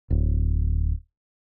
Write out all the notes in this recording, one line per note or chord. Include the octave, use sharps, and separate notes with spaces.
D1